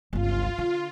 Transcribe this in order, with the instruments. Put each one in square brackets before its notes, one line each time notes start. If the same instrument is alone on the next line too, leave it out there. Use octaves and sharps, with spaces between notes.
[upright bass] G1 C#2 [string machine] F4
[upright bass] D3